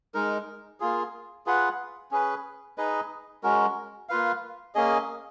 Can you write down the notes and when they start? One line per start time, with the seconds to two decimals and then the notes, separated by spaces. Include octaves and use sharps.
0.14 G#3 D#4 A#4
0.80 A#3 F4 G#4
1.46 F4 G#4 B4 F#5
2.11 C#4 G#4 B4
2.78 D#4 G#4 B4 D#5
3.43 G#3 C#4 F#4 A#4
4.09 A#3 F4 B4 F5
4.75 A#3 C#4 G#4 D#5